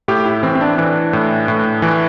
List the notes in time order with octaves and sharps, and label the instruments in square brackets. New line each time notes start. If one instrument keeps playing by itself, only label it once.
[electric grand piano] A2 G4
E4
E3 C4
C4
D4
E3 D4
A2
A2
E3